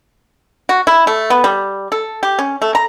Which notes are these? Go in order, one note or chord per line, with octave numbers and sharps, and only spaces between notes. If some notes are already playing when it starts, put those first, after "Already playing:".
F#4
E4
A3
B3
G3
A4
G4
C#4
A3
A#5